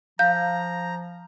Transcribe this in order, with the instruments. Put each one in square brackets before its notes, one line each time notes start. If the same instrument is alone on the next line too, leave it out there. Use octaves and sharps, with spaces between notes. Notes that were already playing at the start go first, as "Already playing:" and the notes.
[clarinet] F3 [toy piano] F5 [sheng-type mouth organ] A#5 [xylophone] G6